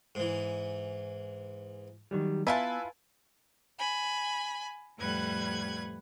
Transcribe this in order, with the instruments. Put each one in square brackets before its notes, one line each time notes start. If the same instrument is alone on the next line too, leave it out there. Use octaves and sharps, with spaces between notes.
[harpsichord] G#2 E3
[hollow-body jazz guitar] D#3 F#3 G3
[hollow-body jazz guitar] B3 [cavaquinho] E4 F4 A5 [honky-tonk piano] B4 E5 G#5
[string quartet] G#5 B5
F2 A2 G3 B4 F#5 G#6